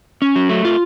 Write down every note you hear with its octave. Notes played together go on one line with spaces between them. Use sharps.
C#4
F#3
A3
F4